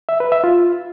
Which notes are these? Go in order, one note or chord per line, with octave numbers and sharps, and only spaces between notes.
E5
B4
E5
F4